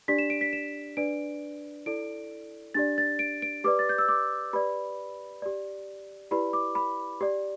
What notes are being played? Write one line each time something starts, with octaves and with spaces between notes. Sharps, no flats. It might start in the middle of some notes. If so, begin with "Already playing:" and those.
D4 G4 D5 B6
E7
D7
B6
E7
D4 B4 D5 D7
E4 A4 D5 D7
D4 G4 D5 A6
A6
D7
D7
G4 B4 D5 D6
A6
G6
E6
D6
G4 B4 D5 B5
G4 D5
E4 G4 B4 D5 B5
D6
B5
G4 D5